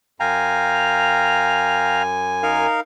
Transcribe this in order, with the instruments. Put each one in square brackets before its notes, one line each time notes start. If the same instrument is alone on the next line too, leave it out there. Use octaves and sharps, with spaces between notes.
[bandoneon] F#2 G#5 [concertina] F5 G5 A#5
[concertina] D#4 A#4 F5